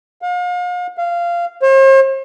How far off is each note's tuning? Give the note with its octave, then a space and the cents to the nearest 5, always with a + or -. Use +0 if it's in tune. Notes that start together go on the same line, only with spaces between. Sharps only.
F5 +40
F5 -15
C5 +45